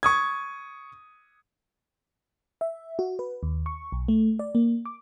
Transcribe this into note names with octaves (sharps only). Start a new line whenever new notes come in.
C#6 D#6 G#6
E5
F#4
B4
D#2
C#6
B1
A3
D5
A#3
D6